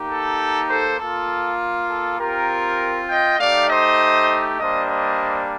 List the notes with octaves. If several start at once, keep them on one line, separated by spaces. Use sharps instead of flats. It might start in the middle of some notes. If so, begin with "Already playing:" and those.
Already playing: A#3 D#4 G4
A4
A4 C5
A#3 F4 A4
A4
C4 F4 G4 A#4
D#5 G5
A3 D#4 G4 D5 F5
C5 D#5
G3 A#3 D4 C5 D#5
C5 D#5